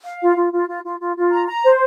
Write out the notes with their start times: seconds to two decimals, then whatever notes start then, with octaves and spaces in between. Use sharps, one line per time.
0.05 F5
0.21 F4
0.36 F4
0.52 F4
0.68 F4
0.84 F4
1.00 F4
1.16 F4
1.32 A#5
1.47 A#5
1.64 C5